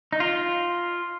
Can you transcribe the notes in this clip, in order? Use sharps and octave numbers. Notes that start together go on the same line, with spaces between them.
D#4
F4